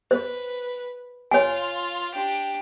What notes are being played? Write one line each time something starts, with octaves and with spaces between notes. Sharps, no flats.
B4 C5
F4 C#5 G#5
D4 G4